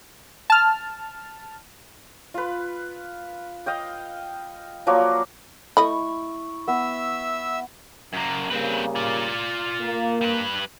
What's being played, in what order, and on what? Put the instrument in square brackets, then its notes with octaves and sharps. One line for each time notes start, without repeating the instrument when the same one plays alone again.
[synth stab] A5 F6
[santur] F4 B4
D#5 F5 G5
F3 F#3 A#3 D5
[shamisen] A3 D#5 B5 [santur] E4 C#6
[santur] B3 [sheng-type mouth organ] E5 E6
[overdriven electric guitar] F#2 A#3
[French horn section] C#3 G3 A#3 [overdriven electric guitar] C4 B4
[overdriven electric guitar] F4 D5
[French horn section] A#3
[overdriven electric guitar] G3 B4